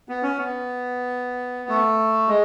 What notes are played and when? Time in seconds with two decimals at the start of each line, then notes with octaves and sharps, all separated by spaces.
0.09 B3
0.23 C#4
0.38 B3
1.69 A3
2.28 G#3